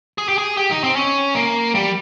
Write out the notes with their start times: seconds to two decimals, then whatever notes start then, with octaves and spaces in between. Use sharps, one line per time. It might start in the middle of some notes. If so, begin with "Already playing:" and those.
0.18 G#4
0.29 G4
0.38 G#4
0.57 G4
0.71 D#4
0.84 C4
0.96 C#4
1.35 A#3
1.75 G3